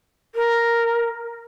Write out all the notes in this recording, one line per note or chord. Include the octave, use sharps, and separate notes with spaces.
A#4